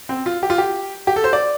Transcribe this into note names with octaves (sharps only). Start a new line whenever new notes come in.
C4
F4
G4
F4
G4
G4
A4
C5
D5